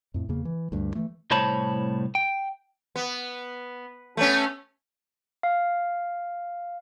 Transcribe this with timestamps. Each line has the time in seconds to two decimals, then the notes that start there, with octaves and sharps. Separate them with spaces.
0.14 F2 A2
0.29 E2 C#3 A#3
0.45 E3
0.72 D2 G2
0.95 E3 A3
1.31 C2 A2 C5 C#5 A5 B5
2.15 G5
2.96 B3
4.17 A3 B3 C#4
5.43 F5